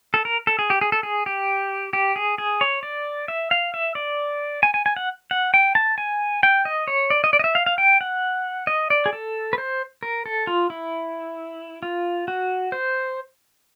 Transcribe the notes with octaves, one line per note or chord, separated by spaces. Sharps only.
A4
A#4
A4
G#4
G4
G#4
A4
G#4
G4
G4
G#4
G#4
C#5
D5
E5
F5
E5
D5
G#5
G#5
G#5
F#5
F#5
G5
A5
G#5
G5
D#5
C#5
D5
D#5
D5
D#5
E5
F5
F5
G5
F#5
D#5
D5
G#4
A4
B4
C5
A#4
A4
F4
E4
F4
F#4
C5